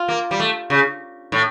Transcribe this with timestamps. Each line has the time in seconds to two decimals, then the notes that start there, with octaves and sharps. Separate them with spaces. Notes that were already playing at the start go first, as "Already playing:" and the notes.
Already playing: F4
0.08 A#3
0.31 G3
0.40 A3
0.70 C#3
1.32 A2